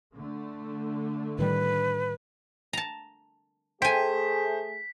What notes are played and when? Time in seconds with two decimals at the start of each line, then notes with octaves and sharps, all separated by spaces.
0.16 D3 A3
1.38 A2 D#3 G3 B4
2.73 A5 A#5
3.82 A3 G#4 C5 G5 G#5 B6